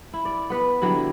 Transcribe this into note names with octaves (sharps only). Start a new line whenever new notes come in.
E4
D5
B3 B4
D3 F#3 G3 E4